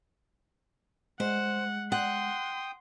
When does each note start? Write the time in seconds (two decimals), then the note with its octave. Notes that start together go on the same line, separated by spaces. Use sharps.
1.20 G#3 C5 F#5
1.92 F#5 G5 C6 D#6